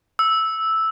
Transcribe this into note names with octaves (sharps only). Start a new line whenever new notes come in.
E6